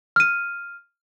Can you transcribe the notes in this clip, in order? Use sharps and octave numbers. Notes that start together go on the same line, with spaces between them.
F6 D#7